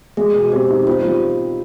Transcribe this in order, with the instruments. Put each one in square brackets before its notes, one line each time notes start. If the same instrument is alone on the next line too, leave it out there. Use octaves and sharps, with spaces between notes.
[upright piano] G#3 [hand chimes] G#4
[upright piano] B2
[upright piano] C4 [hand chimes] G4
[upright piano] D#4
[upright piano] C4 [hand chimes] F4
[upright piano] G3